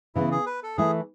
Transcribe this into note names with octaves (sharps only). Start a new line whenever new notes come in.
C#3 E3 B3 E4
G#4
B4
A4
E3 A3 E4 G#4 A4